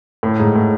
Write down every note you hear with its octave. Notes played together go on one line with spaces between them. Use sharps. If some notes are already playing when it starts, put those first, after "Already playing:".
A2
G#2
A2